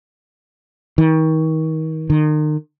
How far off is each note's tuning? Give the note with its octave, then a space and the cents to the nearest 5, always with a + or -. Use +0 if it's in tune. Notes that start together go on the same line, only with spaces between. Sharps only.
D#3 +35
D#3 -35